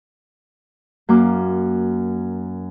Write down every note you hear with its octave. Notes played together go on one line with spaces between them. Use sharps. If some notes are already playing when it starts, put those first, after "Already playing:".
F#2 A#3 D6